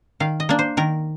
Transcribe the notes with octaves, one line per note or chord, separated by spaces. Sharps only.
D#3 F5
D#5
A#3 D4
C5
D#3 A#4